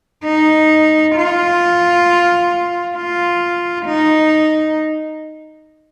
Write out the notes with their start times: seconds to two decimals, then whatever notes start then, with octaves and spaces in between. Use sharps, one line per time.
0.24 D#4
1.15 F4
2.97 F4
3.86 D#4